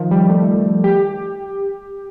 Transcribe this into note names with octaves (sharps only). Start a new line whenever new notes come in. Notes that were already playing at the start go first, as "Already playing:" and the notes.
Already playing: D#3 F3
G3
A3
G4